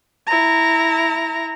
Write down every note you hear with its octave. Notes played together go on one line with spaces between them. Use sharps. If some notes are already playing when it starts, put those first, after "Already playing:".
E4 A#5